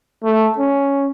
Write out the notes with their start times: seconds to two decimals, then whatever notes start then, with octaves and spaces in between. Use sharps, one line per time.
0.24 A3
0.58 C#4